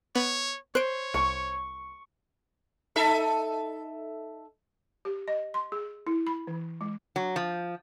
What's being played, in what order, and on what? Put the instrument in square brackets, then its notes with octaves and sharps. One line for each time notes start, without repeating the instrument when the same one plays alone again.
[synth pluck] B3 [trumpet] C#5
[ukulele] C5 [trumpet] C#5 [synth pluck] F#6 D7
[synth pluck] C2 [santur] C#6
[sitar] D#4 A4 E5
[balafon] G4
D#5
C6
G#4
E4
B5
E3
G#3
[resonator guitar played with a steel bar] F#3
F3